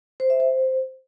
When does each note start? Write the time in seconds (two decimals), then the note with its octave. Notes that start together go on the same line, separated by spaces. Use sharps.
0.20 C5
0.30 E5
0.40 C5